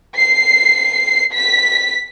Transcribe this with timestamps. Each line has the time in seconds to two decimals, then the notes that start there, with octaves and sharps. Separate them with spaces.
0.16 C7
1.34 B6